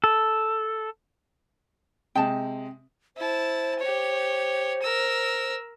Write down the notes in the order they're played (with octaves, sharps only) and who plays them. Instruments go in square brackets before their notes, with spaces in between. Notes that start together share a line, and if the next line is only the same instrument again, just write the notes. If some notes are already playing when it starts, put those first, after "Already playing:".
[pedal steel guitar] A4
[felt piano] C3 G#3 [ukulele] G5 A5
[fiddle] E4 A5 [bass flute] C5
[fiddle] G4 C#5
A#4 E6